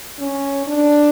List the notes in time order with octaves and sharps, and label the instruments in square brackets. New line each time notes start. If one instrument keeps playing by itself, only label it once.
[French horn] C#4
D4